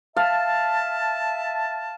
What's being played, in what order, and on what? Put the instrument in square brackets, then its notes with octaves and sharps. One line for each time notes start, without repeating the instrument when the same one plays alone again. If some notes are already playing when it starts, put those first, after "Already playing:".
[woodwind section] E5 A5 [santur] F5